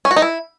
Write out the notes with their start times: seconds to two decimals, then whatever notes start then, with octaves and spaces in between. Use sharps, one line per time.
0.05 C#4
0.11 F#4
0.16 D#4
0.22 E4